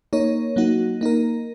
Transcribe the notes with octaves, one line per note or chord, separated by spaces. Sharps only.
A#3 D#4 A#4 C#5
F#3 A#3 D#4 F#4
A#3 D#4 A#4